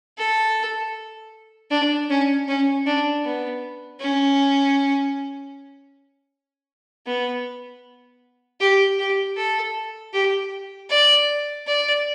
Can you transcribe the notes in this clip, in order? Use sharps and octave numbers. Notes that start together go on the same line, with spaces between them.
A4
D4
C#4
C#4
D4
B3
C#4
B3
G4
G4
A4
G4
D5
D5